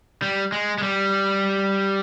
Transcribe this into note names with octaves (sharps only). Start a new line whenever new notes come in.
G3
G#3
G#3
G3